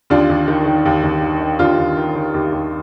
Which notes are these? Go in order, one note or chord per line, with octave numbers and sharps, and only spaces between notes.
D#2 D4 F4
D#2
D#3
D#3
D#2
D#2
D#3
D#3
D#2 D4 F4
D#2
D#3
D#3
D#2
D#2